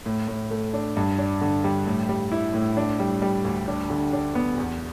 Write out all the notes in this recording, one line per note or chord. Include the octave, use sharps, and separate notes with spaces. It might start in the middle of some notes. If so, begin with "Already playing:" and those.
A2
A2
A3
D4
G2
D4
D3
G3
A2
G3
E4
A2
D4
G3
G3
D2
D4
D3
D4
B3
E2